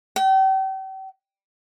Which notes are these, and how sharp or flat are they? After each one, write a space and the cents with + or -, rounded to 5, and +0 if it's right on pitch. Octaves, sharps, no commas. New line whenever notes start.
G5 -40